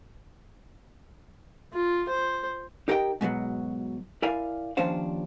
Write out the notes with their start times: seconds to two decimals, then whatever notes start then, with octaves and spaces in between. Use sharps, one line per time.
1.73 F4
2.09 C5
2.88 D#4 G4 A#4 D#5 F5 G5
3.21 G#2 B2 F3 F#3
4.22 E4 A#4 D5 F5 G#5
4.77 D#2 F3 C#4 D4 C5 F5